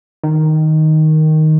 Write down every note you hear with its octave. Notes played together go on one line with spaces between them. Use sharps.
D#3